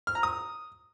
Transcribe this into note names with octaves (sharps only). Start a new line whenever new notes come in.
F6
A#5
D#6